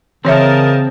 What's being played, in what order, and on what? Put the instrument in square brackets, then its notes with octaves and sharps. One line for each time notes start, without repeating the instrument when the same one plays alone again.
[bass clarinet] C#3 [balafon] E3 C#5 E5 [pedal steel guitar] C4 [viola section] A#4 D#5 A5